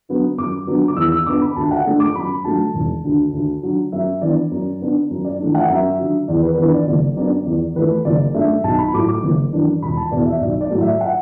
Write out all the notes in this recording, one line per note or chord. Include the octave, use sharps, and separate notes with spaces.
D3 F#3 B3
F#2 D6
D3 F#3 B3
D6
E2 E6
E6
D3 B3 D6
B5
D2 A5
F#5
D3 A3 D4
D6
F#2 B5
D3 F#3 A3 A5
E1
D2 D3
D2
D3 F#3
F#2 E5
E3 B3 D4 D5
F#2
D3 B3 D4
F#2
D5
E3 A3 D4
F#5
F#2 E5
D3 F#3
E2 D5
B4
E3 B3 D4 B4
D5
F#1 D5
F#2 D3 B3 D4 D5
E2 D5
E3 A3 B4
F#1 D5
F#2 D3 A3 E5
B1 A5
B5
A2 F#3 A3 D6
D6
F#1
F#2 E3 D4
E1 B5
A5
E2 B2 B3 D5
E5
B1 D5
D5
A2 F#3 A3
E5
F#5